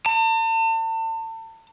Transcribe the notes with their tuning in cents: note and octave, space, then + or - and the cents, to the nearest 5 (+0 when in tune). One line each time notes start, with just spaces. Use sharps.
A5 +40